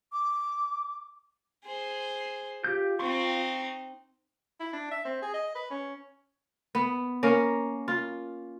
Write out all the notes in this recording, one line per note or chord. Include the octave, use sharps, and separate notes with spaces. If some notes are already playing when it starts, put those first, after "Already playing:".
D6
G#4 C5
F4 G4 G6
C4 D#4 C6 C#6
E4
D4
E5
C4
G#4
D#5
B4
C#4
B3
A#3 C#4 A#4
F4